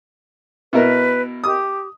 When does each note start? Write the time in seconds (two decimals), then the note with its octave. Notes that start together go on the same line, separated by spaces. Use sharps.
0.73 B2 E4 A#4 B4
1.44 G4 D#6